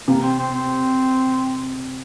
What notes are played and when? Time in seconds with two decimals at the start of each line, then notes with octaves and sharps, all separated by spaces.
0.08 C3 A#3
0.23 C4
0.39 C4
0.55 C4